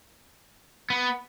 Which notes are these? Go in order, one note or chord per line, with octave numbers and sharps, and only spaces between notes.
B3